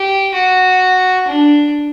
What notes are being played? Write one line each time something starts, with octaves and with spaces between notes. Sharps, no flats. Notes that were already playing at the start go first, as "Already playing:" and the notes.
Already playing: G4
F#4
D4